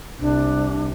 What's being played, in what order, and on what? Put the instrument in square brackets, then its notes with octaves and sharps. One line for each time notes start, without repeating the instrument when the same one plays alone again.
[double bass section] C2 [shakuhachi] D4